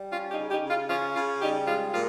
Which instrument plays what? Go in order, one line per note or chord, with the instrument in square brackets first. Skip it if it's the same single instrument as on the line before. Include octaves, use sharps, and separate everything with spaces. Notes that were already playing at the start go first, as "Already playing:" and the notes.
Already playing: [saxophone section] G3
C#4 F4
D#4 G4
C#3
D#4 G4
C#3
F4
C#4 F4
C#3 F4
G3 D#4 G4
G#3 F4
A#2 F4